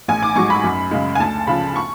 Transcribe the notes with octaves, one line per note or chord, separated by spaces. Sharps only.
A1 G#5
D6
G#2 F#3 C#6
B5
F#2
C#3 G#3
G#5
D2 A5
C#3 F3 B5
C#6